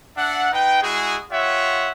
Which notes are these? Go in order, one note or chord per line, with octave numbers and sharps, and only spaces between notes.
D4 E5 F#5
D#4 B4 G5
G#3 E4 F#4 G#4
F4 G4 C#5 E5 F#5